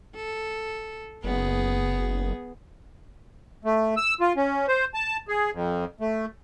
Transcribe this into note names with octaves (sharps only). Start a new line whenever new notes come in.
A4
F#1 B3 G#4
A3
E6
F4
C#4
C5
A5
G#4
F2
A3